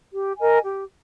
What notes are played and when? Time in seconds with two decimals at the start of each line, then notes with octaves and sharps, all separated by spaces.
0.13 G4
0.38 A#4 D#5 G#5
0.64 G4